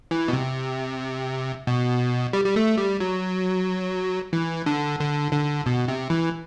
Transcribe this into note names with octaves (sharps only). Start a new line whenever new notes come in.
E3
B2
C3
B2
G3
G3
A3
G3
F#3
E3
D3
D3
D3
B2
C3
E3